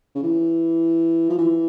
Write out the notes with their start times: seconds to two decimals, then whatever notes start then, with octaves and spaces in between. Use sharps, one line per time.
0.15 C#3
0.23 E3
1.30 F3
1.38 E3